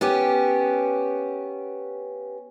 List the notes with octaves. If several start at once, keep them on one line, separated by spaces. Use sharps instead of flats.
B3 C#4 G4